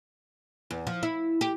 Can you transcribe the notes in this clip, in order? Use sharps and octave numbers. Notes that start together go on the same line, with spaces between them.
E2
F3
E4
G4